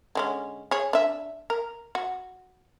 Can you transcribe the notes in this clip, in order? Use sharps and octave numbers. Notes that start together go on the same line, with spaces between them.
D3 G#3 C#4
G#4 C#5
D4 E5
A#4
F#4